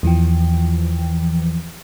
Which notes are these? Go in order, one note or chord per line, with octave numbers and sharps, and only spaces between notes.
E2 E3 F3 G5